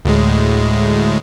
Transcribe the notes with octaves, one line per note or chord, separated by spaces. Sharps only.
D2 A2 G#3